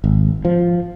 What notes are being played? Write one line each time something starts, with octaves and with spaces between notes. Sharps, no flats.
G#1
F3